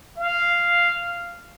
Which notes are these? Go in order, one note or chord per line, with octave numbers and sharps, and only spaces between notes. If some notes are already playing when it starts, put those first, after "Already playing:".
F5